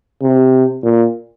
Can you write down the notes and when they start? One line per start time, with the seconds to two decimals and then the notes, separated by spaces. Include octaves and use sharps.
0.22 C3
0.84 A#2